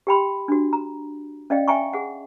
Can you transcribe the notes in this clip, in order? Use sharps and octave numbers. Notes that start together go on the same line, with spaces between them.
G4 G5 B5 C6
D4 F#4
A#5
C#4 D5 D#5 F5 G5
D#5 E5 G5 G#5 A#5 C#6
G#4 F#5